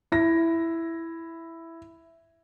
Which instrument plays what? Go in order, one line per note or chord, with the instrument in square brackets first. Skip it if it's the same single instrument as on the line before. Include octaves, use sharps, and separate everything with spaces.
[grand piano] E4 A#6